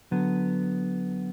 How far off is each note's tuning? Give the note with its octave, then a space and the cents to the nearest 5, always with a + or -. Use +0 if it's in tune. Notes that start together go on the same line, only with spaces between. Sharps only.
D3 +0 F#3 +0 B3 +0